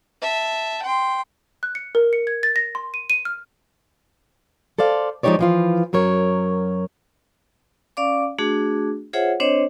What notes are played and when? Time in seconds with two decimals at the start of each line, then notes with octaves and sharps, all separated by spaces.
0.21 E5 A5
0.83 G5 C6
1.63 F#6
1.75 C#7
1.95 A#4
2.13 C#7
2.27 G#6
2.43 A6
2.56 A#6
2.75 C6
2.94 D#7
3.10 D#7
3.25 F6
4.79 A4 C5 D5 F5
5.23 F3 G#3 D#4 G4 C#5 D5
5.39 E3 F3 F4
5.93 F#2 F#3 A#4 C#5
7.97 C#4 D5 F5 D6
8.39 A3 D4 F#4 G#4
9.13 F4 G#4 C5 C#5 E5 F#5
9.40 C4 D4 C5 C#5 D#5